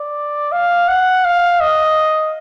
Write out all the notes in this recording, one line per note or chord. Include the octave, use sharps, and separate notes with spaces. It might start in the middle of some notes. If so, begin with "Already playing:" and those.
Already playing: D5
F5
F#5
F5
D#5